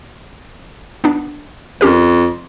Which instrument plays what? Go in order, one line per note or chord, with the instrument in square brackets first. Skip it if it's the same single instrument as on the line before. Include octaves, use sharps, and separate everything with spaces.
[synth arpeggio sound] B3 D4
[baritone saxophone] F2 [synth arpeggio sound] C#4 G4 A#4